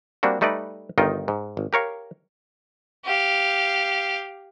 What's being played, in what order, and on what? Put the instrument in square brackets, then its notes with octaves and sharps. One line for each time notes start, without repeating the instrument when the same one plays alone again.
[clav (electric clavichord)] G3 A#3 C4 D4 F#4
G3 A3 D#4 B4 D5
G1 D#3 D#4 F4 G5
G#2
G#1
G4 A#4 C#5 F5
[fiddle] G4 F5